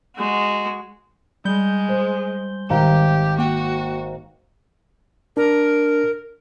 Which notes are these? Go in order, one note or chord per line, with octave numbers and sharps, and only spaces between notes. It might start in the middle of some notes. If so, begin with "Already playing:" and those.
G#3 F#4
G3 G#3 G6 G7
C5
G#1 G4 F5 A#5
A#3 F#4 G5
D4 A#4